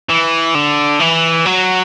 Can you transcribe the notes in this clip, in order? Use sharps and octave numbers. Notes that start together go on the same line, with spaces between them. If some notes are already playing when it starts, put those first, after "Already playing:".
E3
D3
E3
F#3